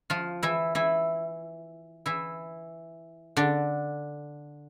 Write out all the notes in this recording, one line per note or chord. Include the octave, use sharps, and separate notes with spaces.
F3 F4
E3 E4
E3 E4
E3 E4
D3 D4